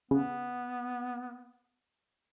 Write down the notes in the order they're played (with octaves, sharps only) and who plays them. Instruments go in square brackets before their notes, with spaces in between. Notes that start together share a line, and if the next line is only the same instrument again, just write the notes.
[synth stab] C#3 [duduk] B3